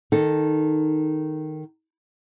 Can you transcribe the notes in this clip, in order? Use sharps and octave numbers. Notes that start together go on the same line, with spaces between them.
D#3 D#4 A4